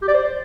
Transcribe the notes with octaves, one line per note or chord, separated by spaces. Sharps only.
G4
D5
C5